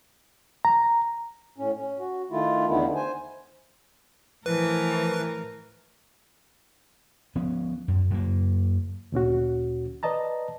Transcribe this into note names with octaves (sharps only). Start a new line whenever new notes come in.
A#5
A2 C#4
C#4
F#4
D#3 A3 E4 F4
E2 D3 D#3 A3 B3 E4
C5 G#5
A2 E3 F3 A#4 B4
F3 B3 C#4
F#2
F#2 F#3 A#3
D2 A#2 C#4 F#4
B4 D5 D#5 A5 A#5